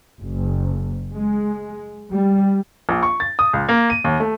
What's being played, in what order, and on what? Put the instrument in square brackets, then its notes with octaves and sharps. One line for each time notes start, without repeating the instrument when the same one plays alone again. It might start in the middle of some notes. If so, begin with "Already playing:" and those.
[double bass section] F#1
G#3
G3
[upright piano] A#1
C#6
A6
D#6
C#2
A#3
D#7
D#2
A3